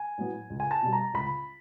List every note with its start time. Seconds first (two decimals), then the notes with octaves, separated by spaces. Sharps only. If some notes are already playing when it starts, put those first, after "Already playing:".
Already playing: G#5
0.18 A2 F#3 B3
0.50 C#2
0.60 G#5
0.71 A5
0.82 B2 G3
0.93 A#5
1.14 C#2 B5